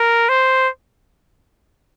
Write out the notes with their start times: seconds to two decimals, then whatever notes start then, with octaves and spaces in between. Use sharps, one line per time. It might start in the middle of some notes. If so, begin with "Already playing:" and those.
Already playing: A#4
0.29 C5